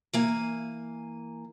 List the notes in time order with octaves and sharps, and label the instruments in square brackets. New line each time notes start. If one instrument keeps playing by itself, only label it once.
[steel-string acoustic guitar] E3 A#3 G#5